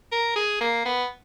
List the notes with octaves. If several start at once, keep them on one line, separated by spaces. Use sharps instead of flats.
A#4
G#4
A#3
B3